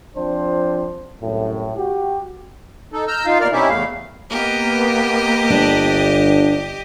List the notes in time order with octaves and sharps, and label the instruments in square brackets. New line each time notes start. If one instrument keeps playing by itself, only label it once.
[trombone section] F3 C4 D4 C5
C2 F#2 A2
F#4 G4
[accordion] D#4 A4
A#5 E6 F6 G6
D#4 F4 F5
D#2 B2 A#4 D5 F6
C3 C#4 D#4 E4 G4 E5
E2 A2 A3 F5
[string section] A#3 B3 [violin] G4 D#5
[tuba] G1 [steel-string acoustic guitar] D4